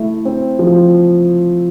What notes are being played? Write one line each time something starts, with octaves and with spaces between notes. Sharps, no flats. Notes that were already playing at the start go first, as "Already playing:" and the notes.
Already playing: A3 E4
C4
F3